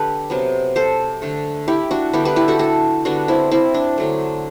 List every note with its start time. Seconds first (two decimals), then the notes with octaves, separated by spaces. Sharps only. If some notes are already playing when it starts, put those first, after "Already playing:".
Already playing: D3 A3 G4 A4 B4
0.30 C3 F#3 B3
0.76 A4 C5
1.22 D3 A3
1.68 E4 G4
1.91 D4 F#4
2.13 D3 G3 B3 E4 G4
2.25 G4 B4
2.36 E4 G4
2.48 F#4 A4
2.59 F#4 A4
3.05 D3 G3 B3 D4 F#4
3.28 C4 E4
3.52 C4 E4
3.74 D4
3.98 D3 F#3 A3